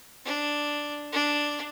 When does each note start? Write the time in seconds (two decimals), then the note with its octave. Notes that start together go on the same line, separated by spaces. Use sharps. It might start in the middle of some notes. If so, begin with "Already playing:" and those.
0.25 D4
1.12 D4